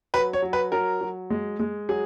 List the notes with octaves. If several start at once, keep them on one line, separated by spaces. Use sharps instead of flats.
F#3 B4
C#5
F#3
B4
F#3 A#4
F#3
G#3
G#3
F#3 G#4